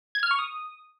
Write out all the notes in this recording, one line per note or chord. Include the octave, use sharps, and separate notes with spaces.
G#6
F6
C#6
D#6